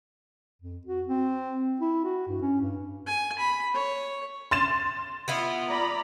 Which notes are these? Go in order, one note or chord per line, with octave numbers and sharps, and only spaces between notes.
F2
F#4
C4
E4
F#4
G2
C#4
G2
G#5
B5
C#5
C6 A6 E7
B3 E4 F4
D5 A#5 B5